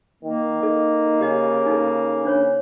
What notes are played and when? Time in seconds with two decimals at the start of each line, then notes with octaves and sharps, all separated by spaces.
0.23 D#3 A#3
0.63 D#4 A4
1.21 C#3 G4 D#5
1.66 D#4 A4
2.25 D4 C5 C#5